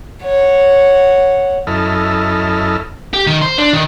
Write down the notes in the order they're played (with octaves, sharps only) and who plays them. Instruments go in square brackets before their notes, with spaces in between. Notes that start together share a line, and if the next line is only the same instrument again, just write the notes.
[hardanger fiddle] C#5 F#5
[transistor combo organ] F#2 E4 A4 D#5 F6
[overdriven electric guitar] G4
D#3
C5
D4
D#3